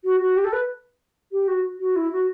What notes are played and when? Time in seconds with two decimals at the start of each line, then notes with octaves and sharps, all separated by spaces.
0.04 F#4
0.20 F#4
0.36 G4
0.44 A4
0.52 B4
1.32 G4
1.47 F#4
1.80 F#4
1.96 E4
2.12 F#4